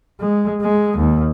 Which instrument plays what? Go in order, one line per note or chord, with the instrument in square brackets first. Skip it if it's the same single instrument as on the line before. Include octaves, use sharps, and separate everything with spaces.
[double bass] G#3
G#3
D#2